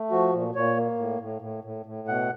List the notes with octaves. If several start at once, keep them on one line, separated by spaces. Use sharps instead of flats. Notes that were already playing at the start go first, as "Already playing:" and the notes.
Already playing: A3
F3 F#4
A#2
A#2 C#5
A#3
A2
A2
A2
A2
A2
B2 F#5